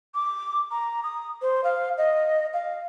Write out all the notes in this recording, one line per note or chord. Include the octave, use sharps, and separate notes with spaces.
D6
A#5
D#6
C5
F5
D#5
F5